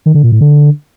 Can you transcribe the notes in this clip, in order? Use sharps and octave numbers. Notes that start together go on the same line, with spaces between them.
D#3
D3
A#2
A2
D3